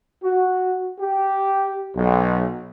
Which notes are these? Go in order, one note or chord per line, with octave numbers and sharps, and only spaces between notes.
F#4
G4
B1